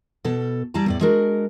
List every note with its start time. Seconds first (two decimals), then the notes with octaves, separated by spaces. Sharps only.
0.24 B2 A4
0.74 G3 E4 D5 A5 A#5
0.86 E2 A2 D5
1.01 G#3 D4 F#4 A#4